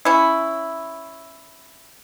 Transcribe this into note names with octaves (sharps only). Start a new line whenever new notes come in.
C#4 E4